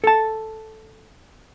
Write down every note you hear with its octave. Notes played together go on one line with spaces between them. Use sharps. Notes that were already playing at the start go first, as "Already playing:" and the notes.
A4 A5